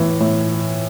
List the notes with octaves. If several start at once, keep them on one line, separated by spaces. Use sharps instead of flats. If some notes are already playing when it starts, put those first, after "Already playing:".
Already playing: A2 E3
A2